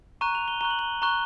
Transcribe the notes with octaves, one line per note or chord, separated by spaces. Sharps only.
A#5 C#6 F#6 D#7
F7
G7
A#5 C#6 F#6 G7
F#7
G7
A#5 C#6 F#6 G7